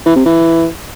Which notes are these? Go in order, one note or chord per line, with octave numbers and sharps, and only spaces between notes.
E3
C3
E3